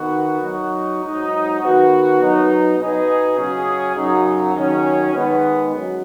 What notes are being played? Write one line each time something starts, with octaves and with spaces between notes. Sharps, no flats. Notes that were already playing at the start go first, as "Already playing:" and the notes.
Already playing: D#3 B3 F#4
F#3 D#4 F#4
G#2 F#3 D#4
D#3 B3 F#4
F#3 B3 D#4
B2 B3 D#4 G#4
C#3 F#3 C#4 G#4
F#2 C#3 F#3 D#4
D#3 F#3 C#4 G#4
D#3 G#3 B3
F#3 C#4